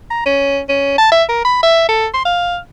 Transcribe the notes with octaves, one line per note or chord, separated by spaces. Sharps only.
A#5
C#4
C#4
A5
E5
A#4
B5
E5
A4
C6
F5